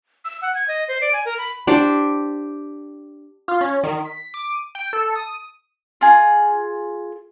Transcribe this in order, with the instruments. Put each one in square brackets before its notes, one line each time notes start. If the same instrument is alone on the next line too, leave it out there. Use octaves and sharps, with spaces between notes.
[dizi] E6
F#5
G#6
D#5
C5
D5
G#5
A#4
B5
[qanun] D4 G4 C5
[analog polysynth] F4
C#4
D#3
B6
D6
D#7
G5
A4
D#6
[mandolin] F4 G#4